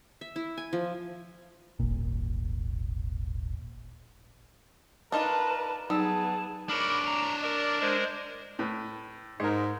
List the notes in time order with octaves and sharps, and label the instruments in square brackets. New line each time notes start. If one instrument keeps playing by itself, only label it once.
[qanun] E5
E4
G#5
F3
[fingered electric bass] D#1 G#1 A#2
[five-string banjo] D4 D#4 F4 [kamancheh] A#4 B4 [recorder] A5
[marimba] F#3 D#4 E6 [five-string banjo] G3 [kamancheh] B3 G#4 [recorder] A5
[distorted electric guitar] D4 C#5 [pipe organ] A#4 B5 [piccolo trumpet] D6
[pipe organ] A#5
[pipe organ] A#4 [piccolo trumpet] D5
[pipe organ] G#3 A#4 C5
[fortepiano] A2 B4
[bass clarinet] G#2 [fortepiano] G#3 A#4